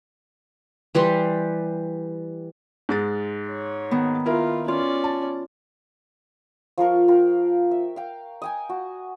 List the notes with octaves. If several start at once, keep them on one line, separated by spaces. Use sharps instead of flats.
E3 G3 G4 C6
G#2 G#3 A6
C#5
D#3 B3
E4 F4 A#4
C#4 F4 D5
A5
F3 F4 A#4 C#6
F4 A#4 G5
E5
F5 G5
D#5 G5 G#5
F#4